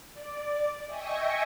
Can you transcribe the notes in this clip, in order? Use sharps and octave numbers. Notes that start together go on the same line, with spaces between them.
D5
D#5 E5 G5 G#5 C#6 D#6